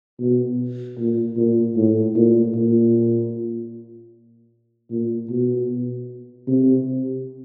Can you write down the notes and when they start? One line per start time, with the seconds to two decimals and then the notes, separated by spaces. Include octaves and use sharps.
0.20 B2
0.98 A#2
1.37 A#2
1.76 A2
2.16 A#2
2.55 A#2
4.91 A#2
5.30 B2
6.47 C3